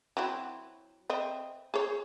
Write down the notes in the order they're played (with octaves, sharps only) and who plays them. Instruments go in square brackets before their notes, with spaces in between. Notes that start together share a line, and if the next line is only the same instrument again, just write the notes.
[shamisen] F#3 C4 E4
C4 D#5 E5
G#4 C5 C#5